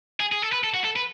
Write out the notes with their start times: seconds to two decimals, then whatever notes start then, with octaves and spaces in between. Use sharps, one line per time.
0.20 G#4
0.32 G#4
0.42 A4
0.53 B4
0.64 A4
0.74 F#4
0.84 A4
0.96 B4